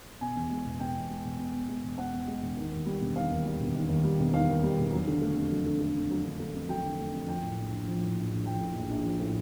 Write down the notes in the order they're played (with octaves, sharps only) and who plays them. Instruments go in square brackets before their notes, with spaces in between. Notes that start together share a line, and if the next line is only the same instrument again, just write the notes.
[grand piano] B2 G#5
E2
G#3
E1
B2 G5
E2
G#3
E1
B2
E2
G#3
E1
B2 F#5
E2
G#3
E1
D#3
D#2
G3
E1
D#3 F5
D#2
G3
E1
D#3
D#2
G3
E1
D#3 F5
D#2
G3
E1
F#3
D3
A3
F2
F#3
D3
A3
F2
F#3
D3
A3
F2
F#3 G5
D3
A3
F2
F3 G5
A2
A#1
A#1
F3
A2
A#1
A#1
F3 G5
A2
A#1
A#1
F3
A2